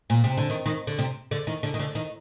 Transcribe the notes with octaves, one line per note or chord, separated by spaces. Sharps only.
A#2
C3
D3
D#3
D#3
D3
C3
D3
D#3
D3
D#3
D3
D#3